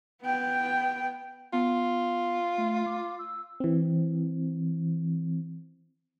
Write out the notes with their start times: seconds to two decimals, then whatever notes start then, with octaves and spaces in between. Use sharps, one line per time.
0.23 B3 G5
1.53 B3 F4
2.58 A3
2.86 D6
3.19 E6
3.60 E3 C4